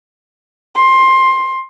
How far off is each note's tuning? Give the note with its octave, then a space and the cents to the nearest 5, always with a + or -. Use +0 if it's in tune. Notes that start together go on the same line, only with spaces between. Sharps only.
C6 +15